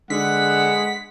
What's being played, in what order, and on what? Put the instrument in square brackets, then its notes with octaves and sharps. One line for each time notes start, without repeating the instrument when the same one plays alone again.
[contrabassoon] D3 [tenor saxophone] G#3 [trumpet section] B3 F#5 [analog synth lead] B6